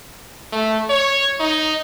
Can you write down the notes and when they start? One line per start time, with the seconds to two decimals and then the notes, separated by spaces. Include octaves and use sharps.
0.52 A3
0.90 C#5
1.40 D#4